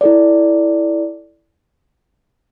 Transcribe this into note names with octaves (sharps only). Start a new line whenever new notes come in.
E4 A4 D5